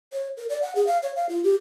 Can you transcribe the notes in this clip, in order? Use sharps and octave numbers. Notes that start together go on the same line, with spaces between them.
C#5
A#4
D5
F#5
G#4
F5
C#5
F5
F4
G4